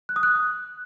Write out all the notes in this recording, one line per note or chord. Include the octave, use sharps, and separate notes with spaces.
F#6
D#6
F#6